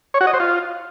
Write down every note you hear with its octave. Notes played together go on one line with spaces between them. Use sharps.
C#5
F#4
D#5
C5
F4